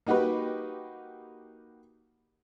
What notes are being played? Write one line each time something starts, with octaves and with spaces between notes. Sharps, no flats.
A#3 D#4 F#4 G4 B4